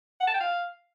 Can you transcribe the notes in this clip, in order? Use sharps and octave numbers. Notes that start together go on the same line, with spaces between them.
F#5
A5
G5
F5